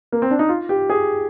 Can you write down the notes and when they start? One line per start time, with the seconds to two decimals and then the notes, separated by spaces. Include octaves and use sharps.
0.12 A#3
0.22 C4
0.31 D4
0.39 D#4
0.49 F4
0.69 G4
0.90 G#4